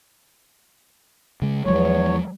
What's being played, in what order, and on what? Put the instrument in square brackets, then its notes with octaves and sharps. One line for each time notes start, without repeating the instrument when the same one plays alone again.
[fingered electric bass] C#3 G#3
[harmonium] E2 C#5 [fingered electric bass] F3 F#3 G#3